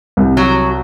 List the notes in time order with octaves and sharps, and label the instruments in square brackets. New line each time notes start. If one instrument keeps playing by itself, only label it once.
[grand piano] C2
[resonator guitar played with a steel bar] F#3